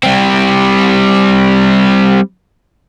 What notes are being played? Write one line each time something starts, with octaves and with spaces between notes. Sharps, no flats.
G3 C4